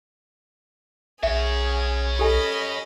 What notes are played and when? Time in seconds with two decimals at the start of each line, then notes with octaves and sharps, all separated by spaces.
1.23 B1 C#4 F#4 G#4 E5
2.19 G4 A4 D#5 G#5 B5